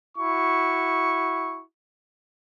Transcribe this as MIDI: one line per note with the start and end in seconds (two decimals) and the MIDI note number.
0.17 1.63 64
0.17 1.63 66
0.17 1.63 85